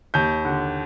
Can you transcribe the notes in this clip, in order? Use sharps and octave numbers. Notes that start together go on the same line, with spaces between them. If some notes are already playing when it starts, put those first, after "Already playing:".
D#2 G6
D3